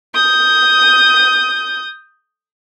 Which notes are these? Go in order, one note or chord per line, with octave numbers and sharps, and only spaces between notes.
D#6 G6